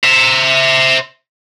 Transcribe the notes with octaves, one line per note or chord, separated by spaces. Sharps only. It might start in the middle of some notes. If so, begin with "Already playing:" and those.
C5 E5